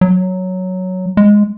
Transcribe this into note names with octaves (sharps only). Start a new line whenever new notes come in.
F#3
G#3